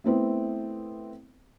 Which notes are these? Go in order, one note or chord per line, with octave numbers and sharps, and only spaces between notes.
A3 B3 C4 E4